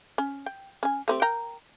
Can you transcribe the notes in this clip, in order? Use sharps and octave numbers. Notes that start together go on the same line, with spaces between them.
C#4
G5
C#4 G#5
A3 C4 G4
A#4 G5 A#5